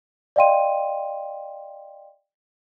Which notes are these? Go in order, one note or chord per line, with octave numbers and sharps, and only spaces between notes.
D5 D#5 F5 G5 C6 D#7